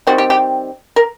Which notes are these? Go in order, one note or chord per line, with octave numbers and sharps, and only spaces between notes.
D#3 G3 C4 F#4
G4
G4
A#4